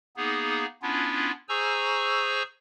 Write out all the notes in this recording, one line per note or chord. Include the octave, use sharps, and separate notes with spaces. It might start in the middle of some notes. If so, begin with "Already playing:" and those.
A#3 B3 D#4 G#4
B3 C#4 D4 E4 F4
G#4 C5 G#5 A#5 C#6 E6